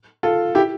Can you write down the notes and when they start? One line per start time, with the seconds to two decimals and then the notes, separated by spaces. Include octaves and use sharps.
0.23 F4 A4
0.55 E4 G4